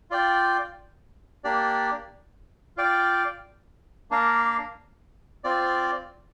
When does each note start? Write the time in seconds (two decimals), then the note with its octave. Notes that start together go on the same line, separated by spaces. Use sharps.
0.11 F4 D5 G5
1.44 A#3 D4 G4 D5
2.77 F4 D5 G5
4.11 A#3 D4 A#4 F5
5.44 C4 F4 D5